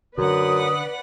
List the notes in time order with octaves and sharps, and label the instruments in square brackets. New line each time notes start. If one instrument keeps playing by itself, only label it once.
[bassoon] F#2 [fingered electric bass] D3 [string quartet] B4 D5 F#5 [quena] D#6